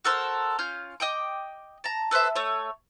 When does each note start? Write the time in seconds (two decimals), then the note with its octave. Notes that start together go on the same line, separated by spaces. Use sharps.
0.05 F#4 A4 A#4 C5
0.59 C#4 F4 F6 G6
1.00 D#5 G5 D6
1.84 A5 A#5
2.11 A4 B4 C5 E5
2.36 A3 C#5